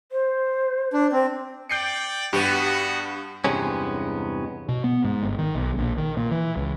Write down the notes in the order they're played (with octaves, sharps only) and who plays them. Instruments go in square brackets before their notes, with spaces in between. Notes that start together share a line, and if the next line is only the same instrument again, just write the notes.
[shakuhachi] C5
[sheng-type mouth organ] D4
C4
[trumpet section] D5 G5 [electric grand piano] G6 C7 C#7
[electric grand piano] G2 [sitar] B3 G4 [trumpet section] F#4
[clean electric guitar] E2 G2 C3 G#3 B3 C#4
[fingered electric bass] B2
B3
G#2
G1
D#3
B1
A#1
D#3
A#2
E3
C#2